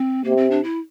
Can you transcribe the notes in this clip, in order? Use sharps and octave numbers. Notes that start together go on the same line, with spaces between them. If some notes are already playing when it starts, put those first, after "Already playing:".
Already playing: C4
C3 A#3
C4
D4
E4